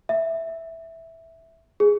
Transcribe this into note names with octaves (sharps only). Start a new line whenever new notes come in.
E5
G#4